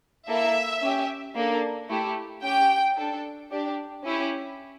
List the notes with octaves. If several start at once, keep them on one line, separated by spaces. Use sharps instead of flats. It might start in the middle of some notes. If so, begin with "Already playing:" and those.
A#3 E4 A4 E5
C#4 G4
A#3 D4 A4
A3 E4 G4
C#4 G4 G5
D4 A4
D4 G4
C#4 E4 G4